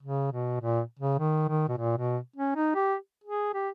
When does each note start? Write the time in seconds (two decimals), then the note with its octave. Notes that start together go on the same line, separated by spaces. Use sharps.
0.02 C#3
0.32 B2
0.60 A#2
0.99 C#3
1.19 D#3
1.48 D#3
1.69 B2
1.77 A#2
1.97 B2
2.36 C#4
2.56 D#4
2.75 G4
3.24 G#4
3.54 G4